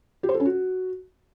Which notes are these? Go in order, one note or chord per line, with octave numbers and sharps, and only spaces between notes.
G4
C5
A4
C#4
F#4